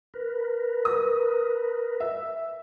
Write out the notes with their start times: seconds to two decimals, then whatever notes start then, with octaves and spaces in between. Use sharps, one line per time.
0.14 A#4 B4
0.85 D#6
2.00 E5